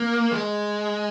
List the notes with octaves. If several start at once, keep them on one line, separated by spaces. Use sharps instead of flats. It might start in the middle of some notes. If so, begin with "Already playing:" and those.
Already playing: A#3
G#3